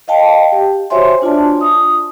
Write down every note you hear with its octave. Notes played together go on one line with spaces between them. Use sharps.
D#5 F5 G5 A5
G4
F#4 C5 C#5 E5 G#5 C6
D4 F4 D5 A5
D#6